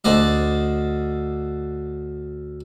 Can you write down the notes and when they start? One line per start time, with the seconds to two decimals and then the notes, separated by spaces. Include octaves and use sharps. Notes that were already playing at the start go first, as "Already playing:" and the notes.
0.04 D2 C5 D5 D#5